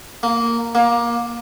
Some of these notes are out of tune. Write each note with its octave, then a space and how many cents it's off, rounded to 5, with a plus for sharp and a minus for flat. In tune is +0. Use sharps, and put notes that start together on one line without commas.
A#3 -5
A#3 +20